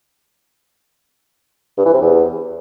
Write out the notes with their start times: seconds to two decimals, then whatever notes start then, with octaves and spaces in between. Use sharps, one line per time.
1.78 G2
1.86 E3
1.94 C3
2.02 E2